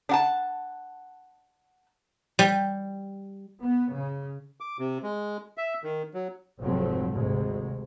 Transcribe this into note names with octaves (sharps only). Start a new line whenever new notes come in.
D4 F#5 A5
G3
B3
C#3
D6
C3
G#3
E5
D#3
F#3
F1 F2 G#2 F#3 A3 C4
G#1 D2 G#2 C3 G#3